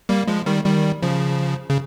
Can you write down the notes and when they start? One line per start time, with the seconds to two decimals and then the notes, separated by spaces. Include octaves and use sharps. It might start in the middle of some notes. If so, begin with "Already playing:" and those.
0.09 G3 A#3
0.27 F3 G#3
0.46 D#3 G3
0.65 D#3 G3
1.02 C#3 F3
1.70 C#3